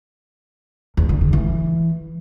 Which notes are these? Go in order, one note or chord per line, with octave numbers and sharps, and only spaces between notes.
E2
D3
D#3
E3